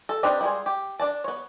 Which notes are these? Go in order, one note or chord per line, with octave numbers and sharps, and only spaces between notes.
A4
C4 D4 D#4 G4 B4
G3 G#3 F4 G#4
G4
D4 D5 A5
B3 C#5